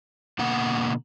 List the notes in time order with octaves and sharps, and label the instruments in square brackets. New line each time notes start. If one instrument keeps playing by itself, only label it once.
[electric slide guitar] B2 D3 A#3 F#5